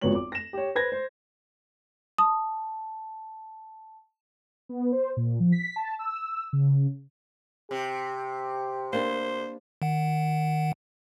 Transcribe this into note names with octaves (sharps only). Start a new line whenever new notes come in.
G#1 F2 B3 F#4 C#5 F#7
D6
A#6 E7
G4 C#5
B4 C5 G#6 A#6
C5
A5 D#6
B3
C5
A#2
F3
B6
A5
E6
C#3
C3 G4
A#3 D4 B4 C5
D#3 F#5